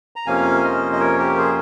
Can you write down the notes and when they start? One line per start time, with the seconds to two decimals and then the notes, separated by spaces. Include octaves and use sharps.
0.16 A#5
0.26 F2 C3 F3 A#3 C#4 F5 G#5
0.64 C5 D#5
0.93 D#5
1.00 A#4 C#5
1.19 G4 A#4
1.37 G#4 C5